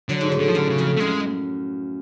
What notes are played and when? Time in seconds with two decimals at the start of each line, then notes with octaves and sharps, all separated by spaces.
0.09 D3 F#3
0.21 G#2
0.32 A2
0.39 D3
0.48 F3
0.55 F#2 D3
0.69 C#3
0.78 F2
0.97 A3
1.00 F#2 G#3